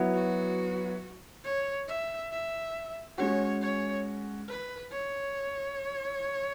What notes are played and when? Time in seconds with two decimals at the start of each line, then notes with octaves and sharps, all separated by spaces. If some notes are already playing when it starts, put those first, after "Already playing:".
Already playing: F#3 B3 E4
0.14 F#4
1.45 C#5
1.88 E5
2.32 E5
3.18 G#3 C#4 F#4 C#5
3.62 C#5
4.49 B4
4.92 C#5